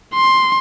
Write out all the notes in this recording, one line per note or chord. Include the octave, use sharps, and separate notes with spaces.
C6